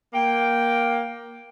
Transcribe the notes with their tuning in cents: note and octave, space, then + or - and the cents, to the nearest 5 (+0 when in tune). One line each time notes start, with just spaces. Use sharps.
A#3 +10 G5 +0